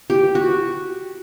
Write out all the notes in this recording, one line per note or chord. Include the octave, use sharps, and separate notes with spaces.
G4
F#4